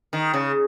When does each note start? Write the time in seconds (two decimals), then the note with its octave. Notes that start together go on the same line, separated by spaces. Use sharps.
0.13 D#3
0.34 C#3